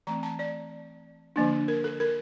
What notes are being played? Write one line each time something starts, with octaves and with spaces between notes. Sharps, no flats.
E3 A3 C4 A#5
A5
D5
D3 F3 A#3 D4
A#4
A4
A#4